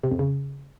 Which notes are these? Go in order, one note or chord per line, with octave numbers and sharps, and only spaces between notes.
C3
F2
C#3